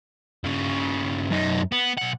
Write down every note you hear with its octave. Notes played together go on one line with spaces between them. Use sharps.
G2 C#3
F#2 D#4
B3
B1 F#5